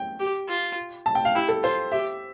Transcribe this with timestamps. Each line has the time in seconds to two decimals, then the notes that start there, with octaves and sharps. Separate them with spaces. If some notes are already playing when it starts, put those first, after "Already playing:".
Already playing: G5
0.19 G4
0.48 F4
1.06 A5
1.15 G5
1.25 F5
1.35 E4 G4
1.49 A4
1.63 F4 C5
1.92 G4 E5